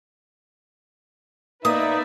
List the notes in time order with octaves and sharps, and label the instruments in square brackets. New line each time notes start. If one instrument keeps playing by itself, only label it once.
[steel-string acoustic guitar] A#3 [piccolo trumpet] D#4 [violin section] B4 D5 E5 [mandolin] D#6